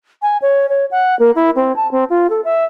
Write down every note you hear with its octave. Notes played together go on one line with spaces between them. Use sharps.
G#5
C#5
C#5
F#5
A#3
E4
C4
A5
C4
F4
A4
E5